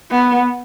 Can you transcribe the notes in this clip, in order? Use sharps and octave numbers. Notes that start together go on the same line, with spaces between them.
B3